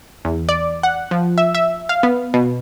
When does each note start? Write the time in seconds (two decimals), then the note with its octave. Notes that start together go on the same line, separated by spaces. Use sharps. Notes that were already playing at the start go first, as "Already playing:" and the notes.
0.25 E2
0.49 D5
0.83 F#5
1.11 F3
1.38 E5
1.55 E5
1.89 F5
2.03 B3
2.34 B2